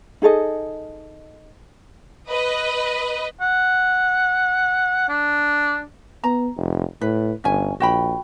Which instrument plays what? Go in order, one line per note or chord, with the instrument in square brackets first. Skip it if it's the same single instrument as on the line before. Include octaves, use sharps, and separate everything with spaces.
[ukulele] D#4 G#4 A4 D#5
[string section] B4 D#5
[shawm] F#5
D4
[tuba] B3 [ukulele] A#5
[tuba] F1
[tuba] A2 [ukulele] B4
[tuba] G1 [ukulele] C#4 G#5
[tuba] A#1 [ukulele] F#4 G5 B5